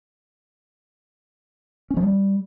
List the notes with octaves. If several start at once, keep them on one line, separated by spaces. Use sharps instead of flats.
C#4
F3
G3